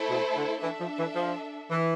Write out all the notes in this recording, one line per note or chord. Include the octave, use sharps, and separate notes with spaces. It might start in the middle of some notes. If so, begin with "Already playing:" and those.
Already playing: A3 E4 A4 C5
B2
D3
E3 D4 A4 E5
F3
E3
F3
E3